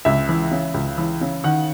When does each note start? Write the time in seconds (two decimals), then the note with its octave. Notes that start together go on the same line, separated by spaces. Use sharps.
0.05 C#2 E5
0.29 E3
0.51 C#3
0.74 C#2
0.98 E3
1.21 C#3
1.44 D#3 F#5